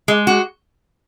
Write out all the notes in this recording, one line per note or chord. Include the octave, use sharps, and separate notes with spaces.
G#3
F#4